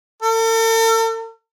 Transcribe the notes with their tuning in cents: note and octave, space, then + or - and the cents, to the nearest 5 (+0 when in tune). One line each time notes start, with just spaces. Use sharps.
A4 +45